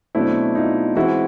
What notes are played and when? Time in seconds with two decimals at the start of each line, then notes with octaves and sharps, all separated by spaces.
0.15 B2 F#3 A3 C4 D4 E4
0.55 D#4 F4
0.96 E3 G#3 C4 E4 F#4